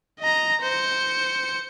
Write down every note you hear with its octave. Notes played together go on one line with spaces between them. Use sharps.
D#5 A#5
C5 C#7